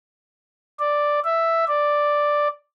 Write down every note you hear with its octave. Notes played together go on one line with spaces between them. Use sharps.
D5
E5
D5